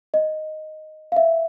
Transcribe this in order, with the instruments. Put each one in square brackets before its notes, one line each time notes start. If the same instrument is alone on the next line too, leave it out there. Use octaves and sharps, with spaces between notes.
[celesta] D#5
F5
E5